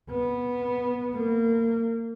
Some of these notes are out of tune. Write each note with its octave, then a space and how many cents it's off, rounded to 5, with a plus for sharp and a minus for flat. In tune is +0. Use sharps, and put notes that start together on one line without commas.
B3 -10
A#3 -30